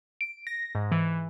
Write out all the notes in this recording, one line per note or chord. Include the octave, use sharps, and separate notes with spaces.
D7
A#6
G#2
E3